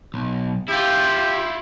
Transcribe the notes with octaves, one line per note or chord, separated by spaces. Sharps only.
B1
E4 F4 G4